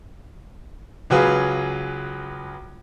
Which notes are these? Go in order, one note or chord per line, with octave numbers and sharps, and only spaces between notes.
C#2 F#3 G#4 B4 F5